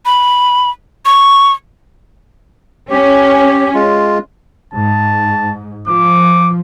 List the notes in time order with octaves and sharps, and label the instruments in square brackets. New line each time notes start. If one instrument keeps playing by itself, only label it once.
[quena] B5
C#6
[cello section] C#4 [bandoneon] G4
[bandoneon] G#3 F4
[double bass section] G#2 [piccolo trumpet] A5
[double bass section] F3 [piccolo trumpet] D6